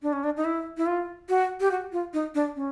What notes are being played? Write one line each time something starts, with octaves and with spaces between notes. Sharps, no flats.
D4
C#4
D4
D#4
E4
E4
F4
F#4
G4
F#4
F4
D#4
D4
C#4